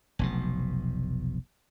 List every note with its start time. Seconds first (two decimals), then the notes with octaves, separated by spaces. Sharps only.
0.19 F1 B1 B2